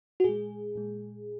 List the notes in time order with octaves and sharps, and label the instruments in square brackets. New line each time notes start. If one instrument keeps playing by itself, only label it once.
[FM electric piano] F#4
A#2 G#3 G#4
A#2 G#3